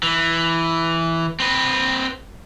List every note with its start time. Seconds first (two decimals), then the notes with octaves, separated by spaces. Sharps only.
0.03 E3
1.40 C4 B4